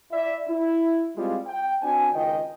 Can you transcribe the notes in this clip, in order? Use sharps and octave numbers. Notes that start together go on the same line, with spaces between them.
E4 D5 E5
E4
G3 G#3 C4 F4
G5
C4 D4 F#4 G#5
C#2 D#3 F4 D#5 G5